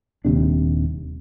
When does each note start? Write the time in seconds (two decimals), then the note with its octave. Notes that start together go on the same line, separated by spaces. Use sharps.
0.25 D#1 D#2 C3 D4